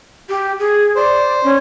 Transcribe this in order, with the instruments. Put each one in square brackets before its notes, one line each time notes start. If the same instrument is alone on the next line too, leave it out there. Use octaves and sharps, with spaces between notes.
[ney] G4
G#4
[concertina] C5 [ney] D5
[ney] C#4